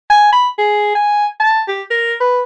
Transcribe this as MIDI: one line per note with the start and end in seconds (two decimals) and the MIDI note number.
0.10 0.31 80
0.32 0.48 83
0.58 0.94 68
0.95 1.26 80
1.40 1.62 81
1.68 1.83 67
1.90 2.14 70
2.20 2.42 71